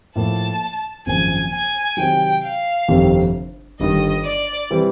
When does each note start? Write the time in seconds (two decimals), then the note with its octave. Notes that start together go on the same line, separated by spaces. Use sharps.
0.15 A2 F3 A#3 A5
1.06 G#1 F#2 C#3 F3 A#3 G#5
1.52 G#5
1.97 C3 D#3 F#3 G5
2.43 F5
2.88 G1 F2 C3 D#3 G3
3.79 G1 G2 D#3 D#5
4.25 D5
4.70 C3 E3 G3